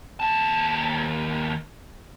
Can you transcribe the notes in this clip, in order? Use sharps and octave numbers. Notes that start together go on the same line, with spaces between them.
D#2 A5